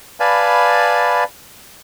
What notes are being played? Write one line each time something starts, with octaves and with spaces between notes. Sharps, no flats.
B4 D5 F5 G#5 A5 B5